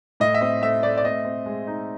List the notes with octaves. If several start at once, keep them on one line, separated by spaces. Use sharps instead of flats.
A2 D#5
E5
C4 D#5
A3 E5
A3 D5
D5
C4 D#5
C4
G#3
D#4